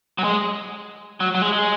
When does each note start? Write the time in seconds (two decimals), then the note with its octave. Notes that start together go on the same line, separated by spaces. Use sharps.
0.18 F#3
0.24 G#3
1.20 F#3
1.35 F#3
1.42 G#3
1.53 G#3